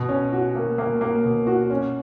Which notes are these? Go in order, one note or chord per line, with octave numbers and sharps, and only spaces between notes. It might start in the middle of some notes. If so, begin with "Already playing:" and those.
Already playing: B2
C#4
F#4
A#3
A#3
A#3
B2
F#4
C#4